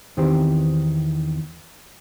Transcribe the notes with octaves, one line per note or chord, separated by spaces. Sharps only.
E2 D#3 E3 C4 G4 C5